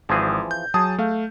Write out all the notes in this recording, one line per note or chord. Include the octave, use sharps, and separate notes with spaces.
G#1 E3 F3 G#4
G6
F#3 G#4 A5 D#6
A3 F5